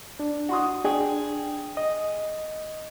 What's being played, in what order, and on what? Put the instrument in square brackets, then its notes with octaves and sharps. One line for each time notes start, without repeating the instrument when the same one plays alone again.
[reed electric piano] D4
[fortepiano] F#4 C6 D#6
[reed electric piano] D4 [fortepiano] G#4 G5
[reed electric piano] D#5